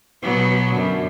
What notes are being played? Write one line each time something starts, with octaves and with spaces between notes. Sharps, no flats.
B2 F#3 B3
F#2 D3